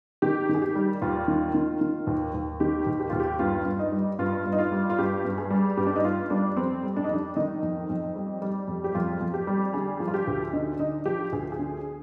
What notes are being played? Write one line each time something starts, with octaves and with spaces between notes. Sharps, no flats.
D#3 G4
D#3
G#4
G4
G3
D#2 F4
D#3
D#3
D#3
D#2
D#2
D#3 G4
D#2
G4
D#2 F4
G4
G2 F4
G2
D#4
G3
G2 F4
G2
D#4
F4
G3
F4
G2 G4
G2
G#4
G3
G2 G4
D4
D#4
G2 F4
G3 D4
F2 C4
G3
D4
D#4
F2 D4
D#3 D#4
F2
F2
G3
G3
F2
G4
F2 F4
F2
G4
G3
D3 G#4
F3
F4
G4
D2
D3 D#4
D3 D#4
F3 G4
D2 G#4
G#4
D3